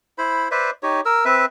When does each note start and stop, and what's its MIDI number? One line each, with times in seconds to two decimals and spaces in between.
0.18 0.48 64
0.18 0.48 72
0.18 0.48 83
0.51 0.71 71
0.51 0.71 72
0.51 0.71 74
0.51 0.71 76
0.83 1.01 63
0.83 1.01 67
0.83 1.01 73
1.06 1.24 70
1.06 1.24 88
1.25 1.46 60
1.25 1.46 71
1.25 1.46 76